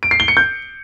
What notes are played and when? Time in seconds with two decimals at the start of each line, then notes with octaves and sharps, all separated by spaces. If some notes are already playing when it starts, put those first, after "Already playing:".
0.03 D7
0.11 C7
0.20 G7
0.28 C#7
0.37 G6